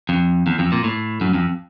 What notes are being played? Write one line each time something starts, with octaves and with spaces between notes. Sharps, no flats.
F2
E2
F2
A#2
A2
F#2
F2